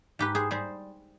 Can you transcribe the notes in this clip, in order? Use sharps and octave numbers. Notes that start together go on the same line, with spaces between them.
G#2 G4 B4
G#4 C5
G3 G#4 C5